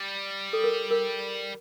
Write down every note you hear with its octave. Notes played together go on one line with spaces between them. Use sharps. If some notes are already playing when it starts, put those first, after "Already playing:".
Already playing: G3
A4
A#4
A#4